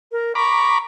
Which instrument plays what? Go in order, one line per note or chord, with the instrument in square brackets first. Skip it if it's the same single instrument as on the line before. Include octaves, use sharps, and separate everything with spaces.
[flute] A#4
[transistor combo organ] A#5 B5 D6 [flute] C#6